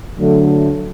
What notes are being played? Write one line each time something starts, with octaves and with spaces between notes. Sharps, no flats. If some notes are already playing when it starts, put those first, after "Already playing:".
D3 F#3 A3